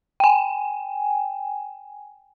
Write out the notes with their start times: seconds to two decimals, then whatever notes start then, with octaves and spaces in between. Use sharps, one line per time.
0.20 G5 G#5